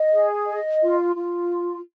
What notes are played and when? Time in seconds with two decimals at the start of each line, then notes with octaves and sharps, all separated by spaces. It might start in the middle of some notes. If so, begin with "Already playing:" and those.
Already playing: D#5
0.12 G#4
0.47 D#5
0.82 F4
1.15 F4